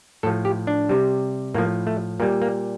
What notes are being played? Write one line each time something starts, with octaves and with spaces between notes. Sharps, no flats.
A2 F3 A4
G4
D4
C3 G3
A2 F3 A#3
A3
A#2 G3 A#3
A#3